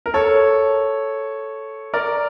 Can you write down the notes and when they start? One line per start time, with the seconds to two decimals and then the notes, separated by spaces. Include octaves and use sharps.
0.06 A#4
0.14 A4 C#5
1.94 A#4 D5